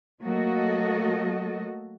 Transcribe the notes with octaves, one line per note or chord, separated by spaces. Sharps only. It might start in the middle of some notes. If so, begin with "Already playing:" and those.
F#3 A3 A#3 F#4 A4 D#5